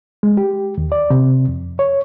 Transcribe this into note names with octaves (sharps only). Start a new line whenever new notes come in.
G#3
G4
D#2
D5
C3
F2
C#5